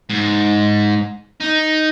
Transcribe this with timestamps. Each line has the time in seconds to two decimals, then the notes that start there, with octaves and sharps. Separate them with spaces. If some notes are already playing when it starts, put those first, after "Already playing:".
0.10 G#2
1.40 D#4